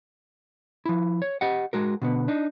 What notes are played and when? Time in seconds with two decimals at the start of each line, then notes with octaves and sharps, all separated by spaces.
0.85 F3 E4
1.22 C#5
1.41 G4 D#5 F#5
1.73 G#3 F#4 A#4
2.02 B2 D3 B3
2.28 D4 D#4